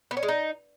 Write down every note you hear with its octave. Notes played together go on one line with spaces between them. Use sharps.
B3
C#4
G#3
D#4